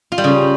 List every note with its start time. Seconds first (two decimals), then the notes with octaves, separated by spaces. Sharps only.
0.12 F4
0.18 G3
0.24 C#3